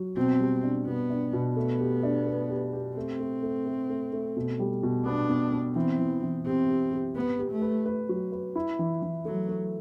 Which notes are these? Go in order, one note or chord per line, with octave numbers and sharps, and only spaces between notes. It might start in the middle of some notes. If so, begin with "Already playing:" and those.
Already playing: F#3
B2 C4
G3
D4
B2 B3
D4
B2
A3 B3
G4
D4
B4
G4
G4
A3 C4
A3
A3
A3
A3
A3
B2
G3
B2
B3 D4
B3
B3
E3 C4
E3
E3
C4 G4
G4
G4
B3 B4
G4
A3
B4
B4
F#3
B4
E4
E3
E3
F#3 A3
A3